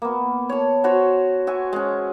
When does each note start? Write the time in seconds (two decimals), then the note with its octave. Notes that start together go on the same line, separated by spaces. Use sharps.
0.02 A#3 B3
0.49 C#5 A5
0.84 F#4 C5 C#5
1.47 F#4 E5 G#5
1.73 G#3 C#4